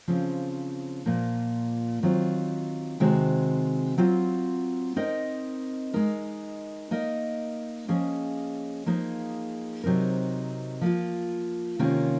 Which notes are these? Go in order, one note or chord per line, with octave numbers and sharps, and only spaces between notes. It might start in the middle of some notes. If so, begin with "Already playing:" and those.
C#3 F3 C4
A#2 F3 A#3
D#3 F#3 C4 F4
C3 D#3 G#3 C4 F#4
F#3 C4 F4
C4 D#4 A#4 D#5
G#3 D#4 A#4
A#3 D#4 A#4 D#5
F3 A#3 C#4 G#4 D#5
F3 A#3 D#4 G#4
C3 F#3 C4 D#4 A#4
F3 A#3 F4
C3 D#3 A#3 C#4 F4